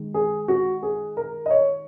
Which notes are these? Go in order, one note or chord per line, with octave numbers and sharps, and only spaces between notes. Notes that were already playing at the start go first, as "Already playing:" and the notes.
Already playing: D#3 G#3
G#4
F#4
G#4
A#4
D#5
C#5